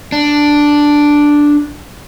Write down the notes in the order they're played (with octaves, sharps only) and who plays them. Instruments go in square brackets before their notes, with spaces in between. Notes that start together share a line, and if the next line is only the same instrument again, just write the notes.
[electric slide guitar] D4